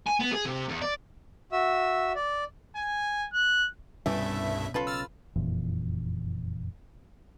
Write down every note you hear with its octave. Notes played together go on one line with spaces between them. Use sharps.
G#5
B3
G#4
C3
E2
D5
F#4 E5 E6
D5
G#5
F#6
C2 G2 B2 E3 G3 A3 C#4 E5
B1 C#3 C#4 F4 A4 B4
E6 F6 A6
F#1 F2 A#2 E3